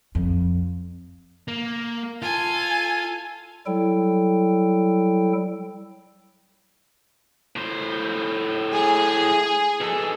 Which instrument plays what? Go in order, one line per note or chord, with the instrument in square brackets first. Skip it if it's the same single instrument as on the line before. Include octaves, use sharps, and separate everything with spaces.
[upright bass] F2
[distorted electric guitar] A#3
[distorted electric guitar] F4 [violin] A4 G#5
[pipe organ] F#3 G3 E4 A4 G5
[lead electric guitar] A2 C5
[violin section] G#4
[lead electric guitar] B2 A4